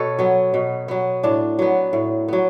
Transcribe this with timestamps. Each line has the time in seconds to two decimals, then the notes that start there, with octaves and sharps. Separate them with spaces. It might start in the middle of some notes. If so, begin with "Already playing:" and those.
Already playing: B2 A4 B4 C#5
0.19 F#3 B3
0.54 B2
0.88 F#3 B3
1.23 A2 D4
1.59 F#3 B3
1.93 A2
2.28 F#3 B3